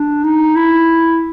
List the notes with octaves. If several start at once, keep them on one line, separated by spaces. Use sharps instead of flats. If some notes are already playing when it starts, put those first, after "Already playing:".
Already playing: D4
D#4
E4